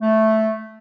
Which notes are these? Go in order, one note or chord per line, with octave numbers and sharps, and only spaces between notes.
A3